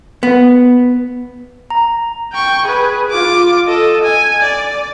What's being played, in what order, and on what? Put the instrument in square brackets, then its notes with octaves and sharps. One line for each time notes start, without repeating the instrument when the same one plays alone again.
[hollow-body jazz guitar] B3
[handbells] A#5
[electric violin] G5 C#6
G#4 B4
F4 D6
A4 D#5
G#5
D5